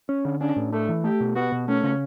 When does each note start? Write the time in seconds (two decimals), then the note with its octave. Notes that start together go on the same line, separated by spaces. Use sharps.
0.09 C#4
0.25 D3
0.41 C#4 D4
0.56 A2
0.73 A3 D4
0.89 E3
1.04 A3 G4
1.20 B2
1.36 B3 F#4
1.52 B2
1.68 A3 C#4
1.84 C#3